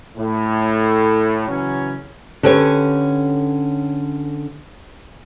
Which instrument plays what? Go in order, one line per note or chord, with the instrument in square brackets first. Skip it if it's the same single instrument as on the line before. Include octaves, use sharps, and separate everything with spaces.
[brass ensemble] A2
C#3 E3 F#3 C#4
[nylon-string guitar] D3 C#4 G4 B4 C#5